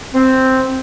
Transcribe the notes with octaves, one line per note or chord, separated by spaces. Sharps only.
C4